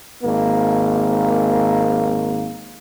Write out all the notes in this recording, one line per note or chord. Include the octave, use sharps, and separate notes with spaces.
G#1 A#3